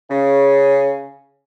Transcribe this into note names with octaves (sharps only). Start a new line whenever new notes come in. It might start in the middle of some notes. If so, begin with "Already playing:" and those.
C#3